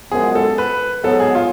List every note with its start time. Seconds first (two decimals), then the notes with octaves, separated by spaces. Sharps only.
0.12 F#2 F3 G#3 B3 G#4
0.35 A4
0.58 B4
1.04 G#2 F#3 B3 A4
1.20 G#4
1.35 F4